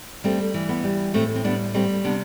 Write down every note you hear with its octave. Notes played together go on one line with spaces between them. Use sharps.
G3 A3 C4
E3
B3
G3
A2 A3 C4
C4
G3 B3 D4
G3 A3 C4
C3 B3 D4